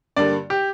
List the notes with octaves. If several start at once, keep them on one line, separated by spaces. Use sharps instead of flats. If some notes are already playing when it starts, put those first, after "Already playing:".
G2 D3 G3 A#3 D5
G4